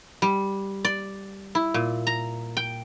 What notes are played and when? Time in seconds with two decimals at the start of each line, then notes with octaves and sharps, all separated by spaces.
0.22 G3
0.85 D5
1.55 E4
1.74 A#2
2.07 A#5
2.57 G5